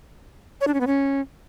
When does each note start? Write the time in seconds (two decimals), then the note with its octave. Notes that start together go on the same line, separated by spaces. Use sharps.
0.61 C#5
0.67 D4
0.74 C#4
0.80 B3
0.87 C#4